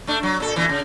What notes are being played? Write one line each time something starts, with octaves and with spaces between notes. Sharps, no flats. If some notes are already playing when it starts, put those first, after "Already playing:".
A3 D4
F#3
A#2 A4
A#2 D3 E3
C#3